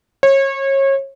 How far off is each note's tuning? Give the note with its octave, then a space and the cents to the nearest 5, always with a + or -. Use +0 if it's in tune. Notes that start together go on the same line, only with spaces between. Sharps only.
C#5 -30